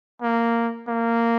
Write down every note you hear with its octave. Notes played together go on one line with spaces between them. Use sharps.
A#3
A#3